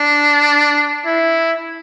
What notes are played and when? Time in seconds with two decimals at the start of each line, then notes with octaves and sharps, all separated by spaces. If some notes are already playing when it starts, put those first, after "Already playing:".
Already playing: D4
1.06 E4